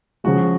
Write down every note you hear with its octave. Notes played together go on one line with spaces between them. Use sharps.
C#3 F3 G#3 F#4